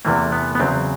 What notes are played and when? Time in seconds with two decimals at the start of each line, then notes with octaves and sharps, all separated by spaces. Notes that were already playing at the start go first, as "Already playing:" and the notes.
0.05 E2 C3 E3 A3 A#3
0.32 B3
0.55 B3
0.60 E2 C#3 F#3 C4